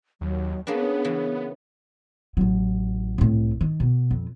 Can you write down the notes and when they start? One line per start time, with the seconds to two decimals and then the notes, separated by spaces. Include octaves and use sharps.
0.21 D#2 F#3
0.67 A#3 B3 C#4 D4 G#4
1.04 C#3 E3
2.37 A1 F#3
3.18 C2 A2
3.61 D#3
3.80 B2
4.11 F2